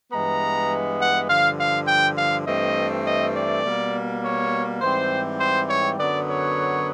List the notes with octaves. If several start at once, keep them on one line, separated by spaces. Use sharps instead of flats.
G2 E3 G#3 B3 A#5
F#5
G2 D3 F3 F5
F5
G5
F5
G2 E3 A3 C4 D#5
D#5
D5
B2 G3 A#3
C#5
G#2 E3 G3 C4 C5
C5
C#5
F#2 D3 F#3 B3 D5
C#5